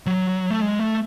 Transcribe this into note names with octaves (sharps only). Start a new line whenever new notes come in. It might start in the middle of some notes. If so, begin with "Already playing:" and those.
F#3
A3
G#3
A3